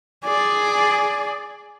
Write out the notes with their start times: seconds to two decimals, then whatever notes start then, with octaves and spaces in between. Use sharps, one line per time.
0.25 G#4 D5